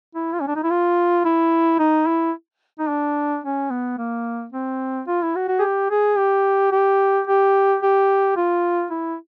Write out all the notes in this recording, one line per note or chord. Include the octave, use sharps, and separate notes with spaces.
E4
F4
C#4
D4
D#4
E4
F4
E4
D#4
E4
D#4
D4
C#4
B3
A#3
C4
F4
E4
F#4
F#4
G#4
G4
G#4
G4
G4
G4
G4
F4
E4